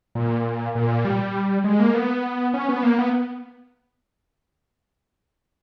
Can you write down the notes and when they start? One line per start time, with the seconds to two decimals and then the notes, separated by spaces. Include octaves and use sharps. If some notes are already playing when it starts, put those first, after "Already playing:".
0.15 A#2
0.75 A#2
1.05 G3
1.64 G#3
1.80 A#3
1.95 B3
2.54 C#4
2.69 B3
2.83 A#3
2.98 B3